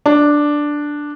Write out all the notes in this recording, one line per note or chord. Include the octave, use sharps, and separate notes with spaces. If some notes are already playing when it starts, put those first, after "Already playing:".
D4